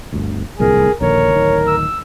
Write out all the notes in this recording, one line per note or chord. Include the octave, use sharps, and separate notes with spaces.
G1 D2
D1 C2 A#2 G#4 A#4
A#1 D#2 D3 A#4 C#5
D1 D#3
E6